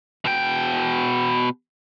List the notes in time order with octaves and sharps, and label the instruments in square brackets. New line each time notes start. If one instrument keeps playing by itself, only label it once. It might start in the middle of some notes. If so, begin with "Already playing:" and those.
[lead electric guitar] B2 G5